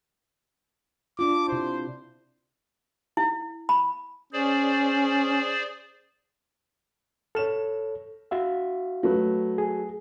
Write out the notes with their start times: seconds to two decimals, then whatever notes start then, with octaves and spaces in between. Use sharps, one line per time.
1.19 D4 F4 D6
1.48 C3 E4 C5
3.17 E4
3.69 B5
4.33 C#4 G#4 C5 D5
7.35 A4 C#5 F6 E7
8.31 F#4 E5 F5
9.03 F#3 A3 B4
9.58 G#4